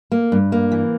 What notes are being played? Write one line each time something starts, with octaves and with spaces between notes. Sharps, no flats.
A#3
G2
A#3
E3